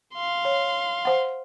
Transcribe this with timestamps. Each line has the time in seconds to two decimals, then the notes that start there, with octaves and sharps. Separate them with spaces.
0.14 F5 C6
0.45 C#5
1.05 C5 F#5